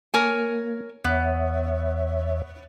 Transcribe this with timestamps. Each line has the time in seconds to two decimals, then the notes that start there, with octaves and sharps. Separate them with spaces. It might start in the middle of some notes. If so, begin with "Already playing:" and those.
0.14 A#3 A#4 C#5 G#5
1.04 E2 B3 C#5 E5